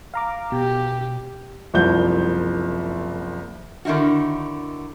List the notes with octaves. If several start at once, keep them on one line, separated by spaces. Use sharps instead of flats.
F5 A#5 D6
B2 G4
F#1 C2 F3 G6
D3 D#3 D#4 E4 F#4